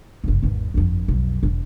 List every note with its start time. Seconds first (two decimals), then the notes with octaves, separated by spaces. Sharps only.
0.24 F#1 C2
0.42 G#1 E2
0.74 G1 F2
1.08 B1 F2
1.43 E1